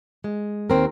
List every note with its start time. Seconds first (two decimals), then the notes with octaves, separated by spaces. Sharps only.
0.24 G#3
0.70 D#2 C4 A#4